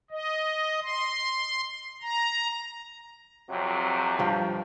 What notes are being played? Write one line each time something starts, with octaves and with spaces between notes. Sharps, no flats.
D#5
C6
A#5
F2 C3 F#3
G2 F3